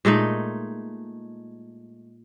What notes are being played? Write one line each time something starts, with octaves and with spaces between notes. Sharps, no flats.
A#2 G#3 A3 D#4